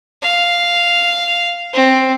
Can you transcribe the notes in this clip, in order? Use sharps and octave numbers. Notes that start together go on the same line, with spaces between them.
F5
C4